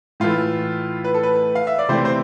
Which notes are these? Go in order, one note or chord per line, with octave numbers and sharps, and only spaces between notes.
A2 E3 A3 F4
B4
A4
B4
F5
E5
D5
C3 E3 A3 C4 C5
C5